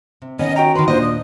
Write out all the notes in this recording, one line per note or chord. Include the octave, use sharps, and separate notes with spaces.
C3
D#3 B3 C#4 D#5
F#4 G5 A#5
D#3 B4 C6
D#2 A#2 D4 C5 D#5
D#6